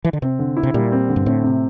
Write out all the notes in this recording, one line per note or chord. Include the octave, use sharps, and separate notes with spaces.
E3
D3
C3 C4
D3
E4
C3
A#2 G3
C4
D3
G2
A2 C4
C3